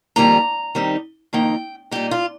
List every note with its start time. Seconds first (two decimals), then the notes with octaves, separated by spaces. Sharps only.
0.16 F2 D#3 G3 A#3 F4 A#5
0.75 D#3 G3 C4 D#4
1.33 F2 D#3 A#3 D#4 G5
1.91 A#2 G3 D#4 G4
2.11 F4